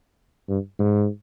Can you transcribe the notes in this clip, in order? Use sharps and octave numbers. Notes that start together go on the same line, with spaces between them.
G2
G#2